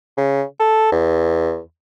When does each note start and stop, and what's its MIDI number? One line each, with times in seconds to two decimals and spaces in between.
0.17 0.43 49
0.60 0.89 69
0.92 1.59 40